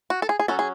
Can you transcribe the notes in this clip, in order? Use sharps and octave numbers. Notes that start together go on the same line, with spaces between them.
F#4
A4
G#4
G#4
F#3 C#4 A4
G#4